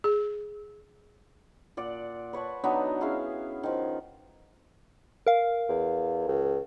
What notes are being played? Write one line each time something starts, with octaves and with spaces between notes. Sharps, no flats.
G#4
A#2 D5 F#5
B4 C#5 F#5 A5
F#3 B3 D4 D#4
C#4 E4 G#4 F5
D#3 F3
A#4 F5
E2
C#2